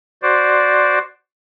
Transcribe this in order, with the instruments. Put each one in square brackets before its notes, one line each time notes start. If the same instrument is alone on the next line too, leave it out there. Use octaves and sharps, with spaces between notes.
[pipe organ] F#4 C5 D5